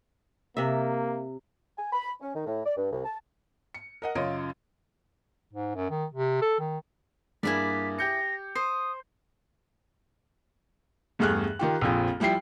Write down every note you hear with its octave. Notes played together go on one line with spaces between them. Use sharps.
C3 A#3 E5
G#5
B5
C#4
D#3
A2
D5
G2
C2
A5
C#7
A#4 D#5 F#5
F#2 C#3 F4 C#5 D#5 D7
G#2
F#2
D#3
C3
A4
D#3
G2 A#3 E4 G#4 D5 B6
G4 G6 A#6 C#7
C5 D#6 C7
E2 G2 A3 G#4 F6 F#6
D#3 F4 G4
A#1 F2 F3
F3 G3 E4 G5 C7